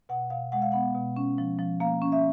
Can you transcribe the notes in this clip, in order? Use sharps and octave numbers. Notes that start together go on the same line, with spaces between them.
B2 F#5
B2 F5
G#3 F#5
F5
B3 F#5
B2
C#4
F3
F3
A#3 F5
C#4
E5